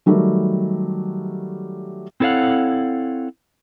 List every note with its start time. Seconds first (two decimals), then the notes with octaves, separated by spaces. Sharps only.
0.06 D#3 F#3 G3 A3
2.20 C4 E4 A4 C#5 F5 F#5